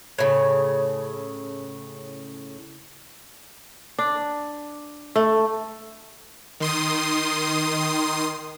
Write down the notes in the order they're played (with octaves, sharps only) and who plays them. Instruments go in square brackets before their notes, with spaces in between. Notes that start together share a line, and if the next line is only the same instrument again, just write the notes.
[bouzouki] A2 C#3
[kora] D4
A3
[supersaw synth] D#3 C6 D#6